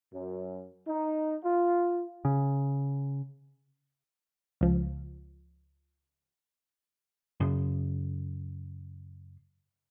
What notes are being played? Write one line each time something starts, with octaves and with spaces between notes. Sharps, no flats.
F#2
D#4
F4
C#3
C#2 F3
F#2 C#3